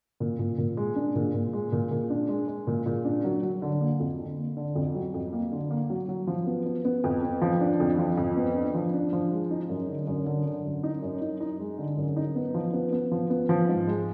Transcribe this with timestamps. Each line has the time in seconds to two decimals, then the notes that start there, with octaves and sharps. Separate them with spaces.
0.20 A#2
0.39 A#2
0.58 A#2
0.77 G#3
0.96 D4
1.15 A#2
1.34 A#2
1.53 G#3
1.72 A#2
1.91 A#2
2.10 D4
2.29 G#3
2.48 G#3
2.67 A#2
2.86 A#2
3.05 D4
3.24 F#3
3.43 F#3
3.62 D3
3.81 A#3
4.00 F2
4.19 D3
4.38 A#3
4.57 D3
4.75 F2
4.95 F#3
5.14 F2
5.33 A#3
5.52 D3
5.71 A#3
5.90 F#3
6.09 F#3
6.27 F3
6.47 B3
6.66 B3
6.85 B3
7.04 F2
7.23 B3
7.42 F3
7.61 D4
7.80 F2
7.99 F3
8.17 F2
8.37 B3
8.56 D4
8.74 F3
8.94 D4
9.13 F3
9.32 G#3
9.51 D#4
9.69 F#2
9.89 D3
10.07 F#2
10.26 D3
10.46 D3
10.64 F#2
10.83 D#4
11.02 F#2
11.21 D#4
11.41 D#4
11.60 G#3
11.78 D3
11.97 F#2
12.16 D#4
12.35 B3
12.54 F3
12.73 B3
12.92 B3
13.12 F3
13.30 B3
13.49 F3
13.69 G#2
13.87 G#3